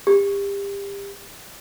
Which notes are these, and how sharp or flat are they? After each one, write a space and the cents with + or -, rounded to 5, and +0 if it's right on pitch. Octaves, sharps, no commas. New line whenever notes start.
G4 +30